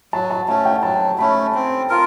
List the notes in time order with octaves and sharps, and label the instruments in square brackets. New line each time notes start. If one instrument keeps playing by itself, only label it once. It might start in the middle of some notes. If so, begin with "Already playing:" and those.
[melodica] F#3 [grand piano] A5
[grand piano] A5
[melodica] A3 C#4 [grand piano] A5
[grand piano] G5
[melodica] F#3 [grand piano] A5
[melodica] A3 C#4 [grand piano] B5
[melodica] C4
F4 A#4